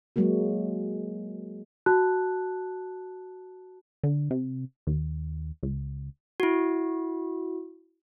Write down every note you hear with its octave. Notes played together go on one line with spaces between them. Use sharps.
F#3 G#3 A#3 F#4
F#4 A5 F#6
D3
C3
D#2
C#2
E4 F#4